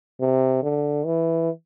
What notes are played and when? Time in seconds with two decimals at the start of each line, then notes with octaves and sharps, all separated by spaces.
0.20 C3
0.63 D3
1.05 E3